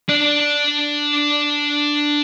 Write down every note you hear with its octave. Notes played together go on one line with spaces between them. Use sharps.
D4 D5